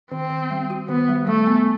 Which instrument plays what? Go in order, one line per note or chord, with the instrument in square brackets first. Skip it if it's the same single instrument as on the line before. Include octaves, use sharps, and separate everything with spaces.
[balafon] D#3 [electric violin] C4
[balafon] D#3
G3
F#4
[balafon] D#3 [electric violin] B3
[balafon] G3
[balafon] G3 [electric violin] A3
[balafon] B3